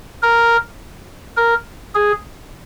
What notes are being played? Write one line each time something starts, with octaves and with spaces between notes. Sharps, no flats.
A#4
A#4
G#4